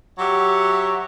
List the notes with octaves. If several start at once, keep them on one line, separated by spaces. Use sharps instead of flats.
F#3 G4 C#5 E5 F#5